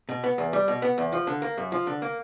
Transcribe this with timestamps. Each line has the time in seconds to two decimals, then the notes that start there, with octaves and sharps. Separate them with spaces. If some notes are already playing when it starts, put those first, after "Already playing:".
0.09 B2
0.24 B3
0.38 E2
0.53 G3
0.68 B2
0.82 B3
0.98 E2
1.13 F3
1.27 D3
1.42 A#3
1.58 F#2
1.72 F3
1.87 D3
2.02 A#3